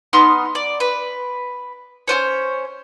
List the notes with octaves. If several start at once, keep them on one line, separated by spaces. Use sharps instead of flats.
B3 D#4 C6 F6
D5
B4
C#4 F4 C5 C#5